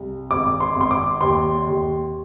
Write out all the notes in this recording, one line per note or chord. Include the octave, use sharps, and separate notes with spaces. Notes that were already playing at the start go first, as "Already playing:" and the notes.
Already playing: C2
G#1 D6
C6
G#1 C6
D6
D#2 C6
D#2